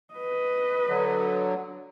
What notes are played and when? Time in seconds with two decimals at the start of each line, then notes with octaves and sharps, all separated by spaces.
0.14 B4 D#5
0.87 D3 F#3